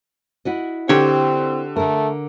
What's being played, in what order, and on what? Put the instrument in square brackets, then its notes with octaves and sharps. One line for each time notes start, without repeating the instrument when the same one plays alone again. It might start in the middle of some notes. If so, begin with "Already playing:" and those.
[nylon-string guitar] E4 F#4 D#5
[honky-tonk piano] D3 [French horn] C4 [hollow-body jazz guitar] G4 C#5
[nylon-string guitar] D3 A#4 [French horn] A3